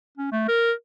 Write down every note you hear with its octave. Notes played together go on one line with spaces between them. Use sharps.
C#4
A3
A#4